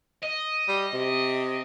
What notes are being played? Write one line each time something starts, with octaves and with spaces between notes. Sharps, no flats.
D#5
G3
C3